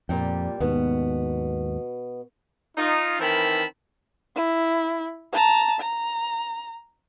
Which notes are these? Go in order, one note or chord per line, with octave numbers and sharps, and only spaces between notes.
F2 A#2 G3 G5
D#2 G#2 B2 B3
D#4 F4
D#3 E3 C4 A#4 A5 B5
E4
A5 A#5
A#5